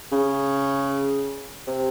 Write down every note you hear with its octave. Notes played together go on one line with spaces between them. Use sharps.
C#3
C3